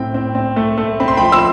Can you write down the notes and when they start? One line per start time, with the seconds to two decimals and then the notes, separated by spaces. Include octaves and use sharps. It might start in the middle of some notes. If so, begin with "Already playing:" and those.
Already playing: A2 C4 G5
0.14 C4
0.35 C4
0.56 A3
0.78 A3
1.00 C4 B5
1.08 C6
1.17 G5 B5
1.21 F3
1.32 C6 E6